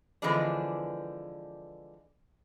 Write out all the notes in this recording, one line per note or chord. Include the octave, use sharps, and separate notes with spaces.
D3 E3 F3 G#3 B3 D4